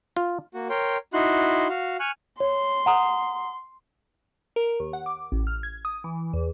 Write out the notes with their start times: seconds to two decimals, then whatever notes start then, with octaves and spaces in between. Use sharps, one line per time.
0.16 F4
0.54 A#3 F#4
0.70 A#4 C#5 G5 C6
1.14 D#4 E4 F#4 C6 F#6
1.69 F#4 F5
2.00 G#5 C#6 F6 F#6
2.40 C#5 C6
2.86 F#5 A#5 D#6
4.56 A#4
4.80 D#2
4.93 F#5
5.06 D6
5.32 A1
5.47 F6
5.63 G#6
5.85 D#6
6.04 E3
6.33 E2